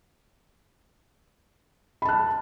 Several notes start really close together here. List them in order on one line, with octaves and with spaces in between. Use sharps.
B5 A5 F#6